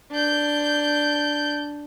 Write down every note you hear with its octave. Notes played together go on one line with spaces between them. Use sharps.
D4 G6